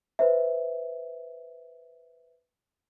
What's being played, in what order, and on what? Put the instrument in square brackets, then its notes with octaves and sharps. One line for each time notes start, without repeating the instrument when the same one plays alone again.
[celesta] B4 C5 E5